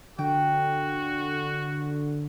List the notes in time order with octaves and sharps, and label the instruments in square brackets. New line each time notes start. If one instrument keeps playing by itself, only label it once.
[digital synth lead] D3 [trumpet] F#4 [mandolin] G5